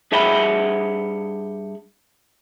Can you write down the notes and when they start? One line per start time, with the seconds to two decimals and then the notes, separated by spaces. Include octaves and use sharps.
0.12 G2 G#4 E5 F#5 G5 B5